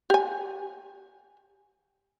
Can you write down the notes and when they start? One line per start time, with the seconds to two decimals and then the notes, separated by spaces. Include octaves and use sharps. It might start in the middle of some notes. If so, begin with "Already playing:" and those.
0.10 G4 G#5